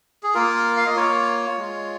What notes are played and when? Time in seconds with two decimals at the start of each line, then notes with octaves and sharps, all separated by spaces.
0.23 G#4
0.35 A#3 F4 A#4
0.77 F5
0.86 D#5
0.96 A#3 F4 C#5
1.58 G#3 F4